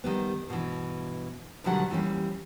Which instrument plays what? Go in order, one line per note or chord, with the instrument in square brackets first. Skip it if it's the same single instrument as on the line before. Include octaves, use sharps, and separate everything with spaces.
[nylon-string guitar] D#3 G3 B3
G2 B2 D#3 E3
B2 D3 D#3 F#3 G3 F#5
D#2 E3 G3 A#3 C#4